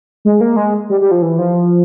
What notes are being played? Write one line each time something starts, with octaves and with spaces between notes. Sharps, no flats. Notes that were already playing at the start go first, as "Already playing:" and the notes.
G#3
A#3
G#3
G3
G3
F3
E3
F3